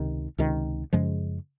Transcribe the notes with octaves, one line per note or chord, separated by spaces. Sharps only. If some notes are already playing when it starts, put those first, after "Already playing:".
Already playing: C#2 C3 D#3
C#2 C3 D#3
F#2 C#3 F3 G#3